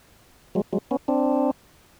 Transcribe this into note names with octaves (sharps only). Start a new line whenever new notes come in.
F#3 G#3
F#3 G#3
B3 C#4
C4 D4